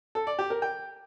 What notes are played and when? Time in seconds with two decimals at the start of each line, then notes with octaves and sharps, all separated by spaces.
0.15 A4
0.27 D5
0.39 G4
0.50 A#4
0.62 G5